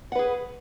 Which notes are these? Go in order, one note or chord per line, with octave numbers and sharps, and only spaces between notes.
G#4 B4 F#5